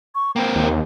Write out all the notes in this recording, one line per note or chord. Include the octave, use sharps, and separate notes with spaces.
C#6
A#3 C4 G5
D#2